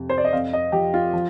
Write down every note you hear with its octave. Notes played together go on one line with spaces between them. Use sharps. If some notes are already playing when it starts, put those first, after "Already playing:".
Already playing: F2 C3
C5
D5
D#5
F2 F5
D#5
F3 G4
F4
F3